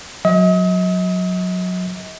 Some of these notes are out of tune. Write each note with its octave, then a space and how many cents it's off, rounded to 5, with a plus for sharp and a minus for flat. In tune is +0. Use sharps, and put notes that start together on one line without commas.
F#3 -20 D#5 +40